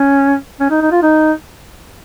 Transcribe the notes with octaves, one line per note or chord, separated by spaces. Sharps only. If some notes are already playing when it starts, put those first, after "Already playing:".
Already playing: C#4
C#4
D#4
D#4
F4
D#4